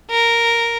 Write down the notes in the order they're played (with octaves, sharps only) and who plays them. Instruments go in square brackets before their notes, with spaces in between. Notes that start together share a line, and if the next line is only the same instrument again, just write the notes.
[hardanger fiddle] A#4